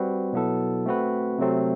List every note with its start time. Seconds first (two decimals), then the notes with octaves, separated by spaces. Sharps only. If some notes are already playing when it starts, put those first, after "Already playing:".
Already playing: G3 C4 F#4 B4
0.33 B2 F#3 B3 E4 A4
0.86 A3 C4 F#4 B4
1.39 C3 F#3 A3 C4